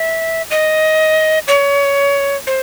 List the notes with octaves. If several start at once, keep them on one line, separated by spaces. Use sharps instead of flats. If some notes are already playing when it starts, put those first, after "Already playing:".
Already playing: E5
D#5
C#5
C5